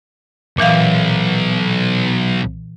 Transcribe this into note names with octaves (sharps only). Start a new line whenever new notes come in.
B1 A#2 E3 F5